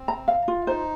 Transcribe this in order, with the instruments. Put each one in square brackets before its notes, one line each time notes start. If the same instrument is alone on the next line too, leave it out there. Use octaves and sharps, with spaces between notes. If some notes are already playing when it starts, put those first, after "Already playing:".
Already playing: [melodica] C4
[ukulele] A#5
F5
F4
[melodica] D#4 [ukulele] C5